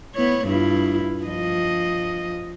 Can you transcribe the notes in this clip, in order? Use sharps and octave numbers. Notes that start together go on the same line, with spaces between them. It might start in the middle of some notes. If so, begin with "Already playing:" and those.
B3 E4 C#5
G2 E4 F4
F3 D#5